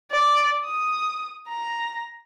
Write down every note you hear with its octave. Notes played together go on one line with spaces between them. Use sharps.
D5
D#6
A#5